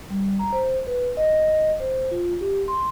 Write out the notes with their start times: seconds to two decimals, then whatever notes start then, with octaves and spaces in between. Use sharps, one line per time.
0.10 G3
0.39 A#5
0.52 C5
0.87 B4
1.17 D#5
1.80 C5
2.11 F4
2.41 G4
2.68 C6